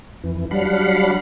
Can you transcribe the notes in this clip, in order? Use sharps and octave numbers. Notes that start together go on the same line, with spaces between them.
F2 E3
F#3 G3 D4 F5 F#5 B5